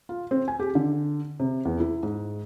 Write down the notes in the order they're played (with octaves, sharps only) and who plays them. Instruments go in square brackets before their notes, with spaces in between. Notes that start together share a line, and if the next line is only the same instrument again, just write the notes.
[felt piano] F4
C4
G#5
G4
D3
C3
E2
E4
G#2